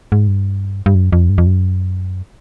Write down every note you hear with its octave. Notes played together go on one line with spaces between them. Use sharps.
G#2
G2
G2
F#2
F2
G2
F2
F#2